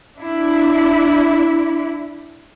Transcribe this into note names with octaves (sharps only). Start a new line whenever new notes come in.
D4 E4